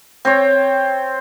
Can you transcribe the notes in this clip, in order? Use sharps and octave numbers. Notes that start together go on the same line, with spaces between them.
C4 C#5